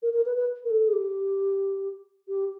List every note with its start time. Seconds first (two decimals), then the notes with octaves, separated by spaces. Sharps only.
0.02 A#4
0.13 A#4
0.25 B4
0.36 B4
0.64 A#4
0.70 A4
0.88 G#4
0.93 G4
2.28 G4